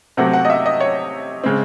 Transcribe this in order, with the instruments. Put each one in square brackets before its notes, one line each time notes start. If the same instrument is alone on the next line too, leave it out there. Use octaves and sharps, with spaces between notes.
[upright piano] C3 F#3 A3 C4 F#5
F#5
D#5
E5
D#5
C#5
C#3 G#3 C4